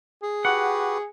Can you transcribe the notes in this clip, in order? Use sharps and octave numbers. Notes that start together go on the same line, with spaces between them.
G#4
F#4 G4 B4 F#5